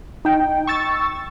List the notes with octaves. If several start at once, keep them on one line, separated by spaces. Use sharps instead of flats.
D#4 G5
C#6 E6 A6